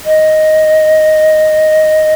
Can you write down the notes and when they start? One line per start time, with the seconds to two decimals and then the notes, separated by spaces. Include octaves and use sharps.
0.05 D#5